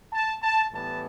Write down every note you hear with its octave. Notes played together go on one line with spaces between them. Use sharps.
A5
A5
A2 E3 G3 B3 A5